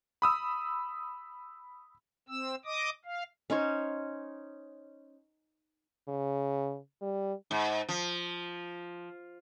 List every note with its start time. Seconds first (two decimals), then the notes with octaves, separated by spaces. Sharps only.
0.22 B5 D#6 E6
2.28 C4 E6
2.65 D#5 D6 D#6
3.05 F5
3.50 C#4 D#4 C5 C#5
6.08 C#3
7.02 G3
7.51 G#2
7.89 F3